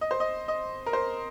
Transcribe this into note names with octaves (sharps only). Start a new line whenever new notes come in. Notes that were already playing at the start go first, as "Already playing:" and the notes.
D#5
C5
D#5
D#5
A#4
C5